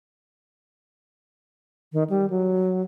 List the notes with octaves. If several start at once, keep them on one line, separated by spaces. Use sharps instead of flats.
D#3
G3
F#3